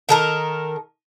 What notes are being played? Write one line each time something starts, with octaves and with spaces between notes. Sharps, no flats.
D#3 A4 A#4